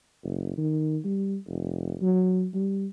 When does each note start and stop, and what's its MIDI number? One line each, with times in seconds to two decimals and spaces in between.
0.23 0.53 30
0.57 0.98 51
1.04 1.37 55
1.47 1.96 29
2.01 2.47 54
2.54 2.87 55